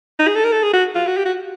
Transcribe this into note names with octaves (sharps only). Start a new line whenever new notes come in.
D#4
G#4
A4
A#4
A4
G#4
F#4
F4
F#4
G4
F#4